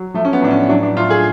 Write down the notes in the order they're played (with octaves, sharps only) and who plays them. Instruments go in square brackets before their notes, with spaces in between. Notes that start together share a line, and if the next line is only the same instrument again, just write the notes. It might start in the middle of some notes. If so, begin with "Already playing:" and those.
Already playing: [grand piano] F#3
F3 A3
C#4
B3
A2 D4
C#4
F#3 D4
D4
A2 F4
G#4